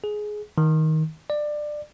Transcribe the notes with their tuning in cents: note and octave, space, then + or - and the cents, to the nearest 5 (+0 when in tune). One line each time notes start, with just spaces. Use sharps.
G#4 +15
D#3 +15
D5 +20